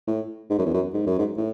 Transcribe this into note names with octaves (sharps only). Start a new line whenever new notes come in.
A2
G#2
F#2
E2
F#2
G#2
F#2
G#2
A2